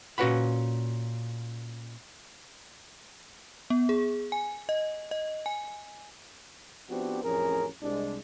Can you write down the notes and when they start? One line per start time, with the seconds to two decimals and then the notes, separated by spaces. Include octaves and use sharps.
0.18 A#2 C#4 F#4 B4 F#5 B5
3.70 B3
3.89 G#4
4.32 G#5
4.69 D#5
5.11 D#5
5.46 G#5
6.89 F3 B3 C4 D4 F#4 G4
7.24 A1 F2 C#4 G#4 A#4
7.81 C2 G#3 D4